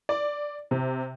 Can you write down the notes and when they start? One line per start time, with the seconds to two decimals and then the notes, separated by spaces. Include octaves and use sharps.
0.09 D5
0.71 C3